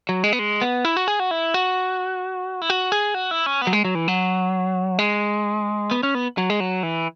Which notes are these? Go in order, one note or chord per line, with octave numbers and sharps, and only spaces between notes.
F#3
G#3
B3
G#3
B3
E4
F#4
G#4
F#4
E4
F#4
E4
F#4
G#4
F#4
E4
C#4
B3
F#3
G#3
F#3
E3
F#3
G#3
B3
C#4
B3
F#3
G#3
F#3
E3